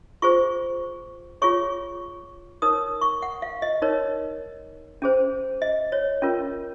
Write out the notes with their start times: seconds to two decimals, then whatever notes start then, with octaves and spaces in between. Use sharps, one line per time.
0.22 F4 G#4 C5 C#6
1.42 F4 G#4 C#5 C#6
2.62 D#4 A#4 C#5 D#6
3.01 C#6
3.22 F#5
3.42 F5
3.62 D#5
3.82 D#4 A#4 C#5
5.02 C#4 G#4 C5
5.62 D#5
5.92 C#5
6.22 C#4 F4 A#4